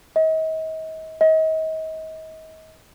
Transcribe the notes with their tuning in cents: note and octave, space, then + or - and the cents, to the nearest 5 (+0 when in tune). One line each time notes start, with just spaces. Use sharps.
D#5 +40
D#5 +35